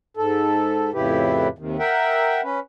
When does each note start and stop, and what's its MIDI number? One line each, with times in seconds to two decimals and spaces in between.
0.17 0.91 44
0.17 0.91 69
0.94 1.48 41
0.94 1.48 45
0.94 1.48 49
0.94 1.48 64
0.94 1.48 67
0.94 1.48 71
1.59 1.77 39
1.59 1.77 48
1.59 1.77 51
1.79 2.41 70
1.79 2.41 76
1.79 2.41 78
1.79 2.41 79
2.43 2.60 61
2.43 2.60 71